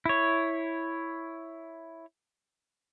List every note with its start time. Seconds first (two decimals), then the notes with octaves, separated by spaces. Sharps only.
0.06 E4 C#5